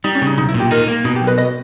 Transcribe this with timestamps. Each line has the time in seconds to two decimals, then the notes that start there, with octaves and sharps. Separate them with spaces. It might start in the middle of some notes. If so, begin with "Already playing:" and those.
0.04 G3 D#4
0.15 C#4
0.22 C#3
0.27 D#4
0.38 B1 D#4
0.48 E4
0.54 A#2
0.60 G4
0.71 D#4 A#4
0.88 A#3
1.04 B2 D#4
1.16 G4
1.22 B1
1.27 B4 D#5
1.38 B4 D#5